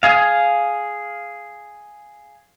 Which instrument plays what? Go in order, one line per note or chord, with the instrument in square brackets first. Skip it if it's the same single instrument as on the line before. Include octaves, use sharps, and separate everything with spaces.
[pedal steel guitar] G#4 F5